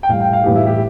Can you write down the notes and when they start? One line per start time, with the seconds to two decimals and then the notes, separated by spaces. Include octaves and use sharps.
0.03 G5
0.09 A2 G3 F5
0.20 G5
0.33 F5
0.44 A2 E3 G3 G4
0.56 E4
0.66 G4